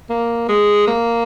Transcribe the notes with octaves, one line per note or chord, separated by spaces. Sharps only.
A#3
G#3
A#3